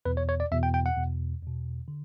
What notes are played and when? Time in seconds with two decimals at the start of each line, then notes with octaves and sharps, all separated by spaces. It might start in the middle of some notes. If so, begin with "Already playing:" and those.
0.05 E2 B2 B4
0.17 C#5
0.29 C#5
0.40 D5
0.52 E2 B2 E5
0.63 G5
0.74 G5
0.86 F#5
0.96 E2 B2
1.43 E2 B2
1.88 D3